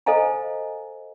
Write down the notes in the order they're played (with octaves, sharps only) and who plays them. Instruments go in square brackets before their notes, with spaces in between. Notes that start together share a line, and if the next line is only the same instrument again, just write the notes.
[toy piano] A4 C5 D#5 F5 G#5 A#5